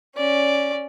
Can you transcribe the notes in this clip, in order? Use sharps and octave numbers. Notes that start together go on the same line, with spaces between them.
C#4 D5